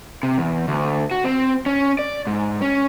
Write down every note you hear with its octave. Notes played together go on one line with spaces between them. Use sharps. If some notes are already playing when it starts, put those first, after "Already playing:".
C3
E2
D2
F#4
C4
C#4
D5
G#2
C#4